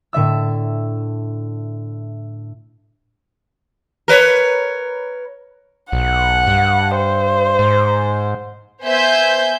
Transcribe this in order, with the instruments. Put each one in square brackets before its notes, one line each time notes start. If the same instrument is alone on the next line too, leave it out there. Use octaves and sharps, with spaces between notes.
[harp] A2 D3 E5 E6
[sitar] A#4 B4 C#5
[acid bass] B1 [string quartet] F#5
[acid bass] G2
[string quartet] C5
[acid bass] G#2
[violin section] B3 C5 E5 G#5 G6